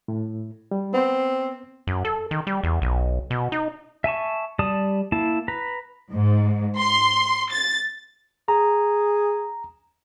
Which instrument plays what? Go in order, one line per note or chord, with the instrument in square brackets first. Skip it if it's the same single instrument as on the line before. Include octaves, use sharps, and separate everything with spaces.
[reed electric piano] A2
G3
[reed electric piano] B3 C5 [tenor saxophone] C4
[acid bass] F#2
A4
D#3
G3
E2
B1
B2
D#4
[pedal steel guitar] E5 G#5 A5 C#6
G3 D5 A5 D#6
A#3 E4 A5
B4 A#5 B5
[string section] G#2
C6
A6
[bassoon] G#4 [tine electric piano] A#5